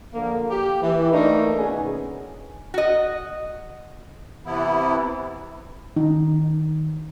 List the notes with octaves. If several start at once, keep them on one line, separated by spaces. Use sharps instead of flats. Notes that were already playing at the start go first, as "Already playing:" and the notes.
D3 F3 A#3
G4
E3
E3 A3 A#3 D4 D#4
B2 D#3 B3 C#4 G#4
F#4 D#5
C3 E3 B3 E4
D#3 D#4